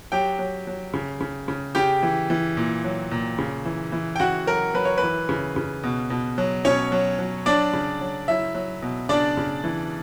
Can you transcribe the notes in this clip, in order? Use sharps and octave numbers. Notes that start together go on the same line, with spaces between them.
F#3 G4 G5
F#3
F#3
C#3
C#3
C#3
C#3 G4 G5
E3
E3
A#2
F#3
A#2
C#3
E3
E3
G5
C#3 F#4 F#5
F#3 A#4
F#3 B4
C#5
E3 B4
C#3
C#3
B2
B2
F#3
B2 C#4 C#5
F#3
F#3
F#3 D4 D5
C#3
F#3
F#3 E4 E5
F#3
B2
C#3 D4 D5
C#3
E3